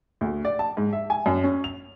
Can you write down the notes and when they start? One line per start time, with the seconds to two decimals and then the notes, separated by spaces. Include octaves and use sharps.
0.21 D2
0.45 D5
0.59 A5
0.77 G#2
0.93 E5
1.10 G#5
1.26 F#2
1.44 C#4
1.64 F7